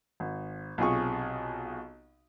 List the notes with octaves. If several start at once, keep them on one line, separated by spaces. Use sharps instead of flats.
G#1
B1 C3 F4 G#4 C#6